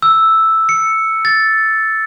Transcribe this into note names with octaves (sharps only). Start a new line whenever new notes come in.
E6
C#7
A6